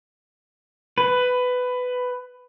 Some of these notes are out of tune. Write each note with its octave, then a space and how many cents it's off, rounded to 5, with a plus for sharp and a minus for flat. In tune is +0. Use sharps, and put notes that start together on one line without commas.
B4 +15